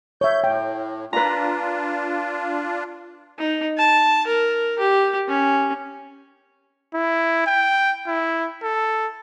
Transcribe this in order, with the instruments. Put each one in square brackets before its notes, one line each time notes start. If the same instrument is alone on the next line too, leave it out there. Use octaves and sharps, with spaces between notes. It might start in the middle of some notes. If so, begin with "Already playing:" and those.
[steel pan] C#5 E5 [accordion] G6
[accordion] A2 [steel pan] G5
[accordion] D4 F4 [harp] B4 A#5
[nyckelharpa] D#4
A5
A#4
G4
C#4
[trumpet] E4
G5
E4
A4